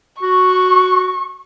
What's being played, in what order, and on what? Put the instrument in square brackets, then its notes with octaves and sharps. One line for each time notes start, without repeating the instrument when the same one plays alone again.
[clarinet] F#4 [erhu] C#6